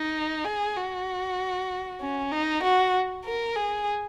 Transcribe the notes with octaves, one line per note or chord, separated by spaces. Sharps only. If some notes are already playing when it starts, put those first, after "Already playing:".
Already playing: D#4
G#4
F#4
C#4
D#4
F#4
A#4
G#4